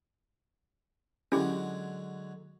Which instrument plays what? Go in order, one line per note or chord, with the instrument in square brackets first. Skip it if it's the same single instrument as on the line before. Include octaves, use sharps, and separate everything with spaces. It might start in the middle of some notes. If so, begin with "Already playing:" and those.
[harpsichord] D3 F#3 G#3 [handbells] C#4 E4 G4